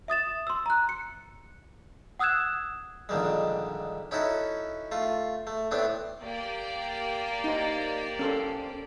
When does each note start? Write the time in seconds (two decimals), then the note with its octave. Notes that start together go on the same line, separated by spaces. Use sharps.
0.08 E5 D#6 A6 E7
0.47 C6 E6
0.66 A#5 F#6
0.89 C#7
2.19 F#5 D#6 E6 F#6 G#6 E7
3.09 A#1 D3 D#3 G3 G#3
4.11 C#4 D#4 E4 F#4 A4
4.92 A3 F4
5.47 A3
5.71 A2 A3 B3 C4 D4
6.22 A#3 G4 D5
7.44 D#4 C5
8.19 C#4 A4 C5